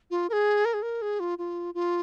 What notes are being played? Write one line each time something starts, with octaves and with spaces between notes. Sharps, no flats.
F4
A#4
G#4
A#4
G#4
A#4
G#4
F4
F4
F4